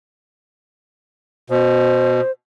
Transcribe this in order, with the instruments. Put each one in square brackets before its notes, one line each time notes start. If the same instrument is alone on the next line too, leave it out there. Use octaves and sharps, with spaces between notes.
[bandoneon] B2 [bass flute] C5